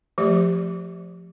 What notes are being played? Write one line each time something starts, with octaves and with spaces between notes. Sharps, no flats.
F3 A3 G4 D5